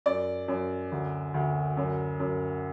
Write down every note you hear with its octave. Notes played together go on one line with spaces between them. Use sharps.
F#2 D5
F#2
D2
D2
F#2
F#2